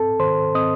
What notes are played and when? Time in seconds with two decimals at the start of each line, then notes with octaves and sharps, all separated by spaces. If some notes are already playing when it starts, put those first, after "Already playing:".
Already playing: C4 A4 A5
0.20 D#3 C5 C6
0.55 C4 D#5 D#6